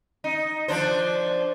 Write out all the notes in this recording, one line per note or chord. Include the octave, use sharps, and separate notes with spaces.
D#4
F3 D4 C5